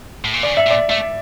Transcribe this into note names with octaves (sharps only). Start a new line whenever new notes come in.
A2
A#2
C#3 D5
E5
A#2
D5
A3 E5